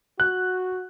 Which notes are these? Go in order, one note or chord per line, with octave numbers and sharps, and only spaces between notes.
F#4 F#6